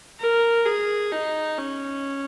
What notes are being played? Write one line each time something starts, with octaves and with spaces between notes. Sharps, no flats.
A#4
G#4
D#4
C#4